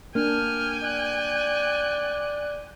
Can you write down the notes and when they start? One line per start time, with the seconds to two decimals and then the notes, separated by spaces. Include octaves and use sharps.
0.15 A#3 D4 G5 G#5 F6
0.83 D5 F#6